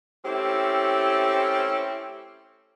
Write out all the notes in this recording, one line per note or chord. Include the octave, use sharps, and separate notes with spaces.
A3 C4 C#4 E4 G4